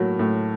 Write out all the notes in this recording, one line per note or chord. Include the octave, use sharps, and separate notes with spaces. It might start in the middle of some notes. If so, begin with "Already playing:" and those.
Already playing: A2 F#3 A#3
A2